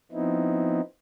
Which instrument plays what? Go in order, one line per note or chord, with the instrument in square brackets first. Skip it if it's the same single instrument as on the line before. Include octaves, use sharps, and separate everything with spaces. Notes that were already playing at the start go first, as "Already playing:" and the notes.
[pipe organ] F3 B3 C4 D#4 E4